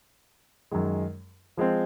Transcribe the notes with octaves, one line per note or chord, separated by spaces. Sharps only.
F#2 D#3 G#3
F3 G#3 C4